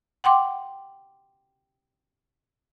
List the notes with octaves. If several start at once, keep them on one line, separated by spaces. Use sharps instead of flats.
F#5 G5 C6 D6